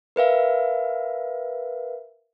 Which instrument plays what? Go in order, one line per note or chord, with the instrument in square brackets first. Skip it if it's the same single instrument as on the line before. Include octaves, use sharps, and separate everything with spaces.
[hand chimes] A#4 B4 E5 F5